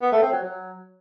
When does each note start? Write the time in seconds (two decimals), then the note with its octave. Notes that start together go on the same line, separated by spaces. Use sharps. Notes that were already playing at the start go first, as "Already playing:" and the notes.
0.02 B3
0.12 A3
0.22 C4
0.32 F#3
0.42 F#3